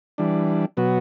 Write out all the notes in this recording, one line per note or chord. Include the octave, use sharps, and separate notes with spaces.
E3 G3 D4
B2 F#3 B3 F#4